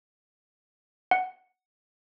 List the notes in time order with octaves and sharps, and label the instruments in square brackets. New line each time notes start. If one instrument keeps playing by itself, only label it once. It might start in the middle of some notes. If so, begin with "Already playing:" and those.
[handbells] F#5